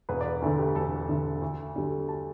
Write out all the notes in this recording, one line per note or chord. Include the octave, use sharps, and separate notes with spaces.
E1 B4
D5
B4
D2 D3 A4
G4
E1 A4
D2 D3
D2
D3 G3
A5